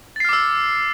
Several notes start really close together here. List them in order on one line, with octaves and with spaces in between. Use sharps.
A6 C7 F6 D6 E6